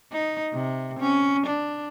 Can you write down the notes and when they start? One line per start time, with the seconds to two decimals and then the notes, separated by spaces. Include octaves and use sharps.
0.12 D#4
0.53 C3
0.99 C#4
1.46 D4